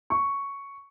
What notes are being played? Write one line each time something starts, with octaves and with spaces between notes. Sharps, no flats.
C#6